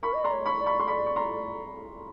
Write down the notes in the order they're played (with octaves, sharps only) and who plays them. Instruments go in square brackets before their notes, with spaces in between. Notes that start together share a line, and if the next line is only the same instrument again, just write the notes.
[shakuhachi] A#4 [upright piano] B5 C#6
[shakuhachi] D#5
[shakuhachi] D5 [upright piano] A#5 C6
[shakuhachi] C#5
[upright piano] B5 C#6
[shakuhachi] D5
[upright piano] B5 C#6
C6
[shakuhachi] D5 [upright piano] B5 C#6
[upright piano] C#6
A#5 C6